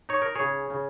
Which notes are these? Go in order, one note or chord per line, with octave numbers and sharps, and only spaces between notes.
D#4 C#5
A#4
C#3 G#4 C#5
C#3